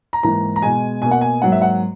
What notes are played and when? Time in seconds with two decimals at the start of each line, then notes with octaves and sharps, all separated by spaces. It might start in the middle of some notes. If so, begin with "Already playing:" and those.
0.13 A#5
0.23 G#2 E3 A#3 A#5
0.56 A#5
0.62 B2 G#3 G#5
1.02 B2 A#3 G#5
1.11 F#5
1.21 G#5
1.42 G#2 F#3 A#3 F#5
1.52 E5
1.62 F#5